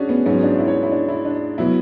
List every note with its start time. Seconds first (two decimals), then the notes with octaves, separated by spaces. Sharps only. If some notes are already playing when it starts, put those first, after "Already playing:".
Already playing: C#4 D4 F#4 G#4
0.09 B3
0.26 G#2 F#3 B3 C#4
0.43 D4
0.55 F#4
0.59 E4
0.67 C#5
0.83 E4
0.92 D4
1.08 E4
1.25 D4
1.58 B2 F#3 B3 E4